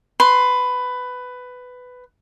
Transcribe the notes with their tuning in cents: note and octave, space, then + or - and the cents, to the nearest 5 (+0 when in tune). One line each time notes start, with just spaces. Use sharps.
B4 +15 C6 +0